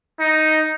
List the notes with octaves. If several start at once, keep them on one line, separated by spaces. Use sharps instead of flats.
D#4